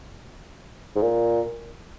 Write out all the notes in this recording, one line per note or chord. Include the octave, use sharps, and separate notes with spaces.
G#2
A#2